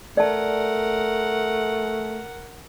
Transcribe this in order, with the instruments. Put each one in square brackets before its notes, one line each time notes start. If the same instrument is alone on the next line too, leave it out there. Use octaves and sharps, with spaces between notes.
[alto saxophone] A3 [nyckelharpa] A#4 F#5 [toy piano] D5 A5